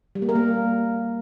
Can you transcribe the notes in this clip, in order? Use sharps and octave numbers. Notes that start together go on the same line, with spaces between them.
G3
A#3
A#4
A#3